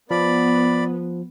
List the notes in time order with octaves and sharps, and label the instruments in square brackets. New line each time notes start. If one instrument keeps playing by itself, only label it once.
[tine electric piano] F3 [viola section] B3 [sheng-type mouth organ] D5 B5